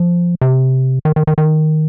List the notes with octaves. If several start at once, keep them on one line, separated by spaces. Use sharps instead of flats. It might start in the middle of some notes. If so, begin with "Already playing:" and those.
Already playing: F3
C3
D#3
D#3
D#3
D#3